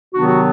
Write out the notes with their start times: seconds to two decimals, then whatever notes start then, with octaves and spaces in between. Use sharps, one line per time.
0.13 C3 D#3 F#3 B3 D4 F#4
0.27 F#4